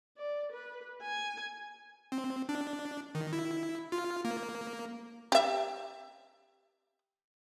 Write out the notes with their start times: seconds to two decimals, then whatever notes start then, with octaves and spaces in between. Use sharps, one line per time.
0.17 D5
0.52 B4
1.03 G#5
2.12 C4
2.49 D4
3.15 D#3
3.33 E4
3.92 F4
4.25 A#3
5.32 G4 E5